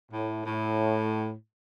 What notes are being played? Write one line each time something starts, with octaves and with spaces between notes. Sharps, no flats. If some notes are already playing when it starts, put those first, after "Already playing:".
A2
A2